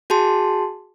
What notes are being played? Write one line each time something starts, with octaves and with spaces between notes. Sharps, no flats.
F#4 G#4 A5 C6